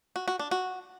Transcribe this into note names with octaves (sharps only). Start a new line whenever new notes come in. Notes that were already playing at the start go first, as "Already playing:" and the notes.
F#4
F#4
D4
F#4